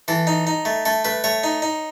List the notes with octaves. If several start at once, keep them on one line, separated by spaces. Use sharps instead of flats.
E3 A4
D#4
D#4
A3
A3 A4
A3 B4
A3 C#5
D#4
D#4